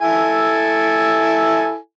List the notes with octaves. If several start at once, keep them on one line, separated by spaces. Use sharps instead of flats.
E4 A4 G#5